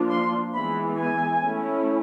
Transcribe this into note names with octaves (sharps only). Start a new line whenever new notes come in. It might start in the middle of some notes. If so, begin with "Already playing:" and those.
Already playing: F3 A#3 D4 F4
C6
E3 G#3 B3 E4 B5
G#5
A3 C#4 E4